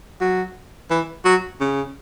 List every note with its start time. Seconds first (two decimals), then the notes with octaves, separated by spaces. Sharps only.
0.21 F#3
0.90 E3
1.25 F#3
1.60 C#3